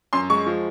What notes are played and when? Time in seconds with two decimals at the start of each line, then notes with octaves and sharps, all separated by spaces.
0.13 F#2 C6
0.30 G#3 C#6
0.46 F3